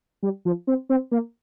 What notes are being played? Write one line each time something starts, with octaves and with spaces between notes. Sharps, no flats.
G3
F3
C4
C4
A#3